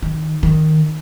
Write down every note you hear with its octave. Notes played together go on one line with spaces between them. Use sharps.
D#3
D#3